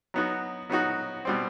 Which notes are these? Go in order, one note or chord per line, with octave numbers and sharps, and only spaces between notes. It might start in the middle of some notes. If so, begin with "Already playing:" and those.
F#3 B3 D#4 F#4
F#3 B3 D#4 F#4
B2 G3 C4